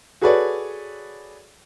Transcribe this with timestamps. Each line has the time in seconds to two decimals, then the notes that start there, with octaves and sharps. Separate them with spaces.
0.21 F#4 G#4 A4 B4 C#5 D5